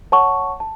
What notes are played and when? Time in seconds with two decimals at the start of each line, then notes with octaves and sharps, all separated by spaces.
0.12 C#5 F#5 A5 C#6
0.60 A5